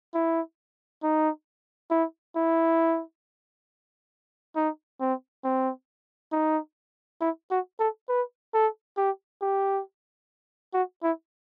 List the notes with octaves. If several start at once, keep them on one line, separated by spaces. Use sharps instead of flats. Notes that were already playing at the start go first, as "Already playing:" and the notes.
E4
D#4
E4
E4
D#4
C4
C4
D#4
E4
F#4
A4
B4
A4
G4
G4
F#4
E4